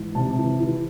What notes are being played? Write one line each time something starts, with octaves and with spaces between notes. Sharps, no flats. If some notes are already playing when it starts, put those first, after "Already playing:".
Already playing: G#2 E3
C3 A5
E3
E3